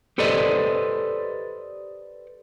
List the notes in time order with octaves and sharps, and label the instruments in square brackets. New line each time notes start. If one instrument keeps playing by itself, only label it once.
[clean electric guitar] G4 A4 B4 C5 D5 D#5